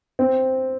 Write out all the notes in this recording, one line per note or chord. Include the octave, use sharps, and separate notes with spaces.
C4